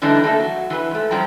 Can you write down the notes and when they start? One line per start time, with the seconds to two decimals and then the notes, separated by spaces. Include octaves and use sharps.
0.02 D3 E3 G3 A3 D4 D#4
0.24 A3 A#3 A4
0.40 F#3
0.70 E3 B4
0.91 G#2 A3
1.11 F#2 F3 G3 G5 A#5